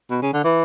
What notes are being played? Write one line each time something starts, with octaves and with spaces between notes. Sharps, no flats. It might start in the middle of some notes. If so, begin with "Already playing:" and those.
B2
C#3
D3
E3